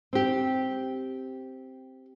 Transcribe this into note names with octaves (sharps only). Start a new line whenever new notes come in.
C4 G4